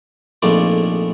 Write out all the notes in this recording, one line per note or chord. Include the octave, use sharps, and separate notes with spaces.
A#1 F2 G#2 A3 F4 D5